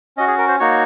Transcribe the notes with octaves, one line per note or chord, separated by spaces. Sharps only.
C#4 F#4 D#5
G#4
A#4
C5
A#3 D#4 F#4 C#5